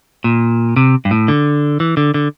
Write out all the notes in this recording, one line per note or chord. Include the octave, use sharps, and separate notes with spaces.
A#2
C3
G2
A2
D3
E3
D3
D3